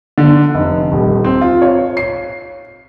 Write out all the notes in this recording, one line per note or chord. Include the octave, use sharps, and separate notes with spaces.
D3
F1
D#1
C4
F4
C#5
C7